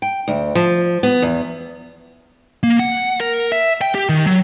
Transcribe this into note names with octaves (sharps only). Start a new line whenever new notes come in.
G5
D2
F3
B3
E2
A#3
F#5
A#4
E5
G5
G4
D#3
F#3